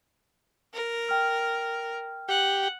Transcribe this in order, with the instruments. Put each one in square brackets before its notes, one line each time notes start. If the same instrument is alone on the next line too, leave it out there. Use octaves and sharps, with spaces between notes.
[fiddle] A#4
[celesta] G5 F6
[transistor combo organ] G4 [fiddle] F#5